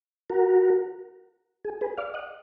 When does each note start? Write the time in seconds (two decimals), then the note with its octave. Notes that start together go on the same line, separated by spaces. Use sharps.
0.30 F#4 A#4
1.65 G#4
1.81 G#4 B4
1.98 D5 F5
2.14 D#5 F#5